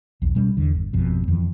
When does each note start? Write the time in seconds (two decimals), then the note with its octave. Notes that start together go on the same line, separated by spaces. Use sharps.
0.22 B1 E2
0.35 B2 G3 C#4
0.57 E2 D3
0.74 G1
0.93 G#1 F2 B2
1.28 F2 D#3 E3